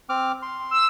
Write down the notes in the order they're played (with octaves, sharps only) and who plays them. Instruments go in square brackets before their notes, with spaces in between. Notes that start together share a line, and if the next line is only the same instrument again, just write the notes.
[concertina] C4 D6 F6
C6
[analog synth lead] E6